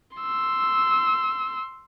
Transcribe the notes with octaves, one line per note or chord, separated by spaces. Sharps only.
C6 E6